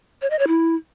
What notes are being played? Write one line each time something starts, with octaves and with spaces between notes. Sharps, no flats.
C#5
D#5
C#5
E4